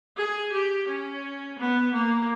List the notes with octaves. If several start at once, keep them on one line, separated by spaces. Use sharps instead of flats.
G#4
G4
C#4
B3
A#3